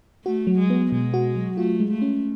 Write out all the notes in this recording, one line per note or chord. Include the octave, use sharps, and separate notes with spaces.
A3 F#4
F#3
G#3
B3
B2 G#3
F#4
F#3
A3 F4
G#3
A3
C#4